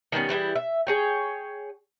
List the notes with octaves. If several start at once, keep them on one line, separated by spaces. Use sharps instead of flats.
D#3 G3 B3 C#4
E3 G3 E4 G#4
E5
G#4 C#5 G5